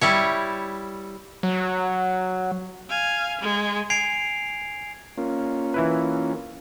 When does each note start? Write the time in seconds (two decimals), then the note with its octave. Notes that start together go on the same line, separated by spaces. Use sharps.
0.01 G3 E4 C#5
1.43 F#3
2.89 F5 G#5
3.41 G#3
3.90 G#5 G#6 C7 D7 F7
5.18 A#3 C#4 F4
5.74 E3 E4 B4